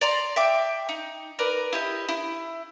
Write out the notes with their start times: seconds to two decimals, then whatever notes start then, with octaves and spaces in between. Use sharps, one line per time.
0.01 D5 A#5 C6
0.36 E5 G5 D6
0.89 D#4
1.39 A#4 B4 D5 A#5
1.73 E4 G4 D#5
2.08 E4